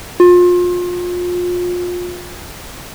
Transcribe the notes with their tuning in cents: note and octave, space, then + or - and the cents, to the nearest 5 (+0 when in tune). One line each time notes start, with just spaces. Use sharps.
F4 +30